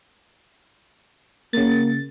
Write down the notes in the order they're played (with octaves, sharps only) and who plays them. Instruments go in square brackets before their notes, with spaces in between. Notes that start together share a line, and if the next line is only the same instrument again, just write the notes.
[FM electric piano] C#3 A6 [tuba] A#3